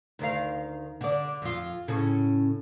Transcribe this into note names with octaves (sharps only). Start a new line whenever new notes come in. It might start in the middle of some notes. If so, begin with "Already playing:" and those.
D2 D#3 F5
D3 D5
F2 F4
A2 C#3 C#4